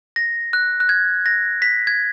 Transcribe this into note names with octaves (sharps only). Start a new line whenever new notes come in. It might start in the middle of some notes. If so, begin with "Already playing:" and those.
A#6
F#6
F#6
G#6
A#6
B6
G#6